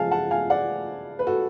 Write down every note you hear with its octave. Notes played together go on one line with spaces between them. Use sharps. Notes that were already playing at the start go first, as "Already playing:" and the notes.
Already playing: C#3 F3 G#3 F5 G#5 A5
F#5 A5
F5 G#5
D5 F#5
B4
F#4 A4